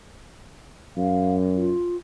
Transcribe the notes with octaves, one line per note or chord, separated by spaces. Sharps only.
F#2 F5
F4